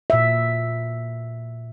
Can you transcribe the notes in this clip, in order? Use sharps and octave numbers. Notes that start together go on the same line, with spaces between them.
A#2 E5